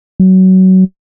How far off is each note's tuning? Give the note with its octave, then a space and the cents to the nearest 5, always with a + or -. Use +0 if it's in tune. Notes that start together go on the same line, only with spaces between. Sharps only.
F#3 +20